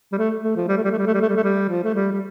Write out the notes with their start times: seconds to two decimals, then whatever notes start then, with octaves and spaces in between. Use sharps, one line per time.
0.13 G3
0.18 A3
0.44 A3
0.56 F3
0.69 G3
0.77 A3
0.84 G3
0.92 A3
0.99 G3
1.07 A3
1.14 G3
1.22 A3
1.29 G3
1.36 A3
1.44 G3
1.69 F3
1.84 A3
1.95 G3
2.13 G3